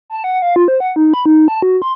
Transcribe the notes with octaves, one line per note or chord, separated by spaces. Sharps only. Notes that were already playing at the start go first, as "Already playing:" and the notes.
A5
F#5
F5
F4
C5
F#5
D#4
B5
D#4
A5
F#4
C6